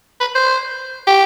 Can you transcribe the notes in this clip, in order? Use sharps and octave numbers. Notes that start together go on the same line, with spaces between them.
B4
C5
G4